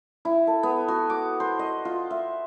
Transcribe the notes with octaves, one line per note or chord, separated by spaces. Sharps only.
E4
A4
B3
F#4
D6
C5
D#5
F4
E5